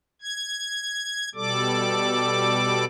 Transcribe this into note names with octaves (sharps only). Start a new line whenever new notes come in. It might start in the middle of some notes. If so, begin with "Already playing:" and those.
G#6
B2 G3 A4 D5 D6